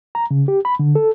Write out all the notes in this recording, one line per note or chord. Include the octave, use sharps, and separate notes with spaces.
A#5
C#3
G4
B5
D3
A4